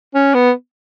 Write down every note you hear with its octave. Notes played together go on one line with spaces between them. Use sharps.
C#4
B3